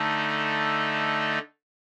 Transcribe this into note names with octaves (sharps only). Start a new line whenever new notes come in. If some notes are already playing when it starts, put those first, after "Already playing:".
Already playing: D3 A3 D#4 A4